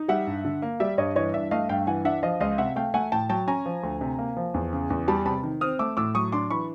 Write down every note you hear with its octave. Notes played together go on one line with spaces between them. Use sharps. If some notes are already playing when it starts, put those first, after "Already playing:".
Already playing: D#4
G3 E5 F#5
G2
D3
A#3
G3 D5 E5
G2 C#5 D#5
E3 C#5 D#5
G2 D5 E5
A3 D#5 F5
G2 F5 G5
E3 F#5 G#5
D4 E5 F#5
F3 D#5 F5
C#2 D#5 F5
C3 E5 F#5
A3 F5 G5
A3 F#5 G#5
A2 G5 A5
F#3 G5 A5
C#4 G#5 A#5
F3
D2
C3
A#3
F3
E2
C#3
E2
G3 A5 B5
C3 A5 B5
D#3
C4 D#6 F6
A3 D6 E6
A2 D6 E6
F#3 C#6 D#6
D4 C6 D6
E3 B5 C#6